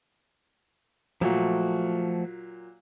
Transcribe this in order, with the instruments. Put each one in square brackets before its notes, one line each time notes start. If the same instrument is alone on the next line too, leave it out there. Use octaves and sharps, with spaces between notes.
[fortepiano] A#2 F#3 [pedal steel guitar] F3 A3 F#4